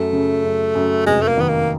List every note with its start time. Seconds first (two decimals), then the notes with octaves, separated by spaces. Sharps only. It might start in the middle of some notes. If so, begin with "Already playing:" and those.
Already playing: F#2 A3
0.13 C#3
0.44 F#2
0.75 F#2
1.07 F1 G#3
1.21 A3
1.28 A#3
1.37 D#3 B3
1.49 A#3